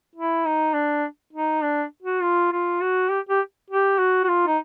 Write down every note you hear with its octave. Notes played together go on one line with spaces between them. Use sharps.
E4
D#4
D4
D#4
D4
F#4
F4
F4
F#4
G4
G4
G4
F#4
F#4
F4
D#4